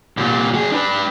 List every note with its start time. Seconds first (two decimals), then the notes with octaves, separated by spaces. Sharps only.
0.17 C2 A#2
0.54 F#3 G#4
0.72 D4 B4